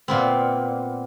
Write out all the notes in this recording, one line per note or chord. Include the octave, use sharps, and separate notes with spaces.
A#2 B3 C4